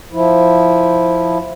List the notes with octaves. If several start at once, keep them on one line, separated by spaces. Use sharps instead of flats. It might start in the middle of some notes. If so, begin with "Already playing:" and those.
F3 E4